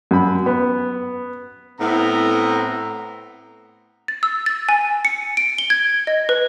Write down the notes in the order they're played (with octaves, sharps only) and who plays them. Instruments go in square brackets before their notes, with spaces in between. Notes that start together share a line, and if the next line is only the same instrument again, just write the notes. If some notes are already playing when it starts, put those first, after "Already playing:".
[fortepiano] F#2 B5
B3
[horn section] A2 B3 C4 A#5
[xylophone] A6
E6
A6
G#5
C#7
D7
G7
G#6
D#5
B4